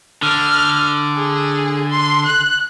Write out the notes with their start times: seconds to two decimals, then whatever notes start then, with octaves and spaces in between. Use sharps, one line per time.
0.22 D3 F6
1.16 G#4
1.90 C6
2.25 F#6